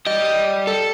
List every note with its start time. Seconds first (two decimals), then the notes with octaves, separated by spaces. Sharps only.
0.07 G4 D5 D#5
0.67 A4